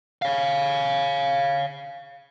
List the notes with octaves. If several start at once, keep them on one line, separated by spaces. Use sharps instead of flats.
C#5 F5